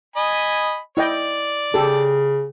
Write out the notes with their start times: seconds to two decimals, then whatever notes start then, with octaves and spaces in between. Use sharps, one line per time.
0.16 D#5 G#5 B5
0.97 E4 D5 D#5 G5
1.74 C#3 G4 A4